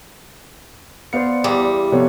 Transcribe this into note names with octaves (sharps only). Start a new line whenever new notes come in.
B3 C5 D5 F5 C#7
E2 G3
C3 F3 B3 A4 C#5